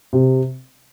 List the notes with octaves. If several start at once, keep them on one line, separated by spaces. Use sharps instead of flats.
C3